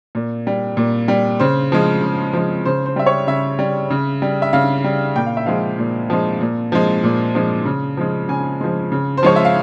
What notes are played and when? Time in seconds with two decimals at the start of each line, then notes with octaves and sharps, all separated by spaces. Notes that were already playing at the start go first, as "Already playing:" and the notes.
0.15 A#2
0.47 G3
0.77 A#2
1.08 G3
1.40 C#3 C5
1.72 F3 G#3
2.02 C#3
2.33 F3 G#3
2.65 C#3 C5
2.86 C5
2.96 G3 E5
3.06 C#5
3.27 C#3 E5
3.59 G3
3.90 C#3
4.22 G3
4.42 E5
4.53 C#3 F5
4.84 G3
5.16 A#2 G5
5.26 F5
5.37 E5
5.46 F3 G#3 F5
5.78 A#2
6.10 F3 G#3
6.41 A#2
6.72 F3 G#3
7.04 A#2
7.35 F3 G#3
7.66 C#3
7.97 F3 G#3
8.29 C#3 G#5
8.61 F3 G#3
8.92 C#3
9.17 C5
9.23 F3 G#3 C#5
9.36 E5
9.45 F5